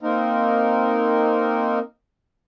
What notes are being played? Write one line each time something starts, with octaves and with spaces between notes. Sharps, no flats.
A#3 C4 D#4 A#4